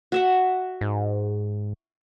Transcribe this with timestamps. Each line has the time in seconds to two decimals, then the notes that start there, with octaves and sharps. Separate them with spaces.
0.12 F#4 E5 F#5
0.81 G#2